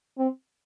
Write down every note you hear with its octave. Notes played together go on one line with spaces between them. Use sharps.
C4